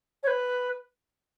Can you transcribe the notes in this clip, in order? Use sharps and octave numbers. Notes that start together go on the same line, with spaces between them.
C#5
B4